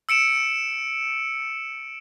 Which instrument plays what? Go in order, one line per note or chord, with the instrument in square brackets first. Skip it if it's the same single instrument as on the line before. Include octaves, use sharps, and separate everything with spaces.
[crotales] E6 C#7 D7 E7